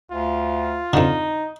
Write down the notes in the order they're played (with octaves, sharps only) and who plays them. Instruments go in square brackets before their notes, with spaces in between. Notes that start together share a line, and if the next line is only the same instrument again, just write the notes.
[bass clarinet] D2 [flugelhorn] F4
[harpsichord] F2 D3 [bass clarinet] D#4